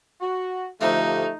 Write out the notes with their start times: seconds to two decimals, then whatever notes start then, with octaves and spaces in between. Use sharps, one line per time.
0.21 F#4
0.81 D2 C3 F3 A3 D#4 F4 G4